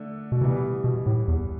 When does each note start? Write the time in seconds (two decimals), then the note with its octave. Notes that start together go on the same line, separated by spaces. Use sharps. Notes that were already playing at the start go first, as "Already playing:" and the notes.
Already playing: D3 A3 D4
0.32 B2
0.41 C3 E3 G3 B3
0.84 B2
1.06 A2
1.28 E2